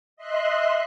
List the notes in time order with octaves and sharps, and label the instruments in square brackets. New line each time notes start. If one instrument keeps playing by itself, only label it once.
[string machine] D#5 E5 C6 F#6